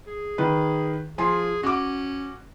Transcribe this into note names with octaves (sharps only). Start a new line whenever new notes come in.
G#4
D#3 B4
F3 G#4 G#5 C6
C#4 F#4 D6